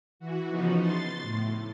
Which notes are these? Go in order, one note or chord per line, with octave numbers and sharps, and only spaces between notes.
E3 F#4
C#3 F3 B3 D#4 F#4
C6 A6
A2